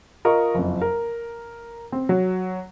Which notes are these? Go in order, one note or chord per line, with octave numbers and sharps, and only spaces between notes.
F4 A#4 D#5 C#6
F#1 F2
A#4
C4
F#3